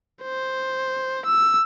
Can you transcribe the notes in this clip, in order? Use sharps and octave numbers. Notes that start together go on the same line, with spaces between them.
C5
E6